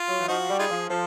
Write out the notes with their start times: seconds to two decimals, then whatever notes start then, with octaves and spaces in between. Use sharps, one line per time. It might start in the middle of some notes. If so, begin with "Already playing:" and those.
Already playing: F4
0.09 F#3
0.19 E3
0.28 F3 D#4 F#4
0.49 G3
0.59 D#4 F4 G#4
0.70 F3
0.89 F3 A4